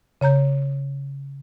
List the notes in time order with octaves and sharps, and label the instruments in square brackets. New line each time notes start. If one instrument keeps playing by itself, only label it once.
[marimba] C#3 C#5 A#5 G6